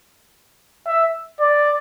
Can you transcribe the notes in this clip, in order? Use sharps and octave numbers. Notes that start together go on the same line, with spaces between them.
E5
D5